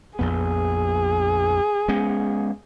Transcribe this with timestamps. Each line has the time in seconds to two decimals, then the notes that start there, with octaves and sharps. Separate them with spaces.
0.19 A#1 F2 B3 G#4
1.88 G#3 B3 C#4